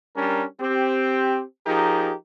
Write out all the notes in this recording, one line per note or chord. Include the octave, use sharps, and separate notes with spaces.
G3 C#4 D4 A#4
C4 G4
F3 D#4 G4 G#4 A#4